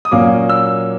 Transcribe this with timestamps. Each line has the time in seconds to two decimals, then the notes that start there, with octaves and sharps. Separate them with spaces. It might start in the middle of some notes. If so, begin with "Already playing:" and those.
0.05 D#6
0.11 A#2 F#3 A#3 C#4 D6
0.49 E6